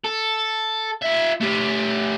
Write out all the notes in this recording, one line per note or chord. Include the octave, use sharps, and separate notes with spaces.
A4
F4 E5
A3 G4